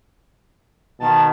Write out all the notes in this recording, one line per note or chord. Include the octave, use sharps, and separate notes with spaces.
B2 D#3 A5